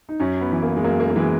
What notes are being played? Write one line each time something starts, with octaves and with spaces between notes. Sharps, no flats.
D#4
F#2 C#4
B3
E3
A#3
G#3
F#2 A#3
A#3
A#3
E3 G#3